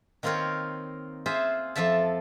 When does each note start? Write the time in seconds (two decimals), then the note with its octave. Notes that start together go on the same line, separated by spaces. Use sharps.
0.23 D#3 A#3 C4 F4 A#4 C#5
1.26 F4 G#4 C5 E5
1.75 F2 F3 A4 E5 A5